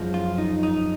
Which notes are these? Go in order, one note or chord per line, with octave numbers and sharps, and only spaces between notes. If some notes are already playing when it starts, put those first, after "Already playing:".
Already playing: F#2 F3 G#3
F4
D#4
D#4